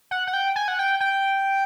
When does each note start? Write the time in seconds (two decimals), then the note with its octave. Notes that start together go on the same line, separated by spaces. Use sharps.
0.11 F#5
0.27 F#5
0.33 G5
0.56 G#5
0.68 F#5
0.79 G5
1.00 G5